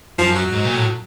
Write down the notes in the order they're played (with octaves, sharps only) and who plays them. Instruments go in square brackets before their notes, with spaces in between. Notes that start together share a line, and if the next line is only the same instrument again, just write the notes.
[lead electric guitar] F#2 [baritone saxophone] F3
[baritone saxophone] F#3
[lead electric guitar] G#2
A#2
A2